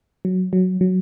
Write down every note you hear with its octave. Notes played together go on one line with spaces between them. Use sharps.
F#3
F#3
F#3